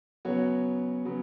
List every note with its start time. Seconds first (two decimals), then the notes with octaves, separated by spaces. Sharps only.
0.25 C#3 F#3 B3 F#4 C#5
1.05 C#3 F#3 B3